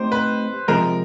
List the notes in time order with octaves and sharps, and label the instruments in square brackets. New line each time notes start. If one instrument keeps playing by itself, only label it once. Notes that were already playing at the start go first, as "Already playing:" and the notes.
Already playing: [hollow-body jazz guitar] A3 C4 D#4 G4 [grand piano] C5
[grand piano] B4
[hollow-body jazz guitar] C3 F3 G#3 [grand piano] A#4